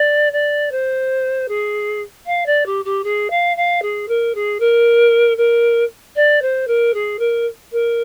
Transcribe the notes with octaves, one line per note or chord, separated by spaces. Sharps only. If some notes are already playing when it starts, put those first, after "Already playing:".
Already playing: D5
D5
C5
G#4
F5
D5
G4
G4
G#4
F5
F5
G#4
A#4
G#4
A#4
A#4
D5
C5
A#4
G#4
A#4
A#4